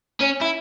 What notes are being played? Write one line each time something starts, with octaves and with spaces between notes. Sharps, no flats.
C#4
E4